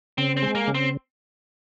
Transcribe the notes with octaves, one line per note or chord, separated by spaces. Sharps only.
C#3 C4
C4
G#3
A#3
C#3
C4